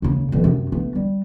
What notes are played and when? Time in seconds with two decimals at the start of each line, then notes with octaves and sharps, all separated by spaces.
0.02 D#2 C#3
0.32 D#1 E3
0.44 F#2 C3
0.72 A3 B3
0.95 G3